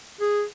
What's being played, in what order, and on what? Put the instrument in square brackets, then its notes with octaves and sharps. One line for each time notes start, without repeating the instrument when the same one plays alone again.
[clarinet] G#4